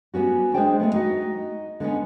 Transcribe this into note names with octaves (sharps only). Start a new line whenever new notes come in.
G3 B3 C#4 F#4
G#3 D4 G#4 C5 D5 G5
G#3 A3 B3
D#4 F#4 D#5
D3 G#3 B3 C#4